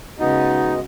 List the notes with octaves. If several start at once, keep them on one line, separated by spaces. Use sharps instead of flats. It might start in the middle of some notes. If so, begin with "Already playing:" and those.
C#3 G#3 B3 D#4 F#4 D#5